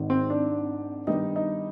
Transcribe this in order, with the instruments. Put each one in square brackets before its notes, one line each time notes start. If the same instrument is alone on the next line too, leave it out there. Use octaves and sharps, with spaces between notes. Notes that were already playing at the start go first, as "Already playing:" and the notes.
Already playing: [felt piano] G#1 G#2 D#3
[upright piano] C4
D4
[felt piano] G2 D#3 G3 B3 [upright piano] D#4
[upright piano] D#4